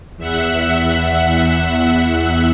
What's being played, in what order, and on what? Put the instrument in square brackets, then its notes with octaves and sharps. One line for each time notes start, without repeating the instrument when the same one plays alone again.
[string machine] E2 E5 F#5